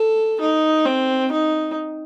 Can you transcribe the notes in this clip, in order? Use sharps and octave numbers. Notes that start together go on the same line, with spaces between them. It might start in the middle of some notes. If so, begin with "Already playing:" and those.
Already playing: A4
D#4
C4
D#4